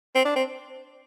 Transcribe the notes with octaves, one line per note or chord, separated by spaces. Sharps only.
C4
D4
C4